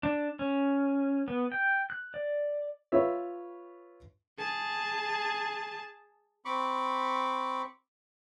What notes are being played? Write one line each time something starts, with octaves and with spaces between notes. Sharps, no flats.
D4
C#4
B3
G5
F#6
D5
F4 B4 C#5 E5
G#4 A5
C4 B5 C#6 D6